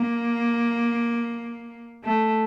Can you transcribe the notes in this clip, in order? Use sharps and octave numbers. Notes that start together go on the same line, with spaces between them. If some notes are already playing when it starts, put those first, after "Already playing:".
Already playing: A#3
A3